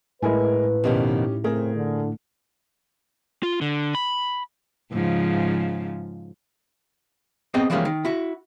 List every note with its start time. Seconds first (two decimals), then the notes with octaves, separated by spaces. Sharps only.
0.22 A2 G#3 E4 A#4 B4 G#5
0.84 F2 B2 D#3 C#4 D#4 G4
1.44 C#3 A3 C4 G#4 A#4
1.75 D3
3.43 F4
3.61 D3
3.95 B5
4.92 G#2 C#3 F3
7.54 B3 C4 G#4 D#5 G5
7.70 E3 F3 G3 G#3 A#3 C#4
7.85 D#3
8.05 E4 F#4